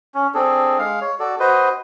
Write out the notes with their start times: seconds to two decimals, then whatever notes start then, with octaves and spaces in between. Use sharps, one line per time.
0.15 C#4
0.34 C4 D4 G#4 A4
0.79 G#3 F5
1.02 C#5
1.20 F#4 A4 D5
1.39 F#4 B4 C5 D#5